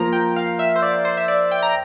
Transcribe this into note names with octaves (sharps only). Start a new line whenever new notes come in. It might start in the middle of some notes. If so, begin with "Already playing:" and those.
Already playing: F3 A#3 F4 A#5
G5
F5
E5
C5
D5
C5
E5
D5
G5
A#5